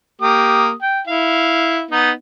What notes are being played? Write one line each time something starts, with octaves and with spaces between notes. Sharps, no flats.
A#3 G4 D#6
G5
E4 F5
B3 D#4